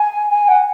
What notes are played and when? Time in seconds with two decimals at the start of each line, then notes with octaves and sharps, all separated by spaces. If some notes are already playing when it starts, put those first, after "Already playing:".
Already playing: G#5
0.30 G#5
0.48 F#5